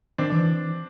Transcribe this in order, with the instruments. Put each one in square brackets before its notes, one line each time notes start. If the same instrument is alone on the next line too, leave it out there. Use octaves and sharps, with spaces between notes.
[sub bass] D#3 [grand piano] C4 D4
[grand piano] D4
[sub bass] E3